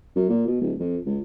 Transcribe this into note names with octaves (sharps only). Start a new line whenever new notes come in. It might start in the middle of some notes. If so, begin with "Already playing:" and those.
F#2
A#2
B2
D1
F2
C#2